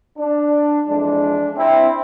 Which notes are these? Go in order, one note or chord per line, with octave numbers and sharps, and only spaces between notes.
D4
F2 E3 G#3 D4
C4 E4